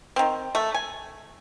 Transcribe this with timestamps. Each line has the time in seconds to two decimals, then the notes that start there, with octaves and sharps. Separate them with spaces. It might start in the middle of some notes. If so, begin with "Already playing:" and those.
0.16 D#3 C4
0.55 A3
0.74 G#5